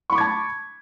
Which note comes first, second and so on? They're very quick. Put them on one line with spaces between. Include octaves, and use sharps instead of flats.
C#6 B5 D6 G#6 A5